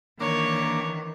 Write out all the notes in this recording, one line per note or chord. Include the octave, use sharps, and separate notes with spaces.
D#3 E3 A#3 D4 C#5